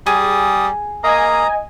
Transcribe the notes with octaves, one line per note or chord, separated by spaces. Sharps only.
G3 G#4 D#6
A#3 D#5 G#5 A#5 D#6